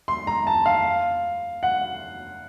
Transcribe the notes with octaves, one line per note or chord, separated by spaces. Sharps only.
C6
A#5
A5
F5
F#5